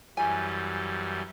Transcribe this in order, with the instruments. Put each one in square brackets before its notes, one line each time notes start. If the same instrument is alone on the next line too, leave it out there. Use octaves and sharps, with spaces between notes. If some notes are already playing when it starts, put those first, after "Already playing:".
[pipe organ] F#2 E3 G3 [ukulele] G#5